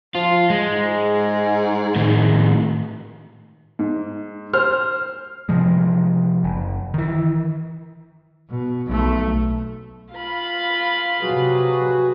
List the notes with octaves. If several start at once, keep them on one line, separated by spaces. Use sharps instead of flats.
F3 F4
G#3
G#2
A2 D#3
G#2
C5 F6
C3 F3 G#3
F#1
D#3 E3
B2
B1 A3
F4 F5 B5
C3 F#3 F#4 G#4 B4